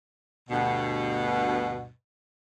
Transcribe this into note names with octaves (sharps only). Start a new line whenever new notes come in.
D2 G2 B2